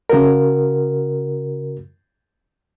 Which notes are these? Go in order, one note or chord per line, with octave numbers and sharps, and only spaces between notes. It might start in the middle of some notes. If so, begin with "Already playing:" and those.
C#3 F#4 A#4